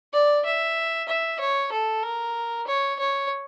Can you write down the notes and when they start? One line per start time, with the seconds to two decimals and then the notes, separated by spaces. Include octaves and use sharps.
0.13 D5
0.45 E5
1.08 E5
1.39 C#5
1.72 A4
2.03 A#4
2.67 C#5
2.99 C#5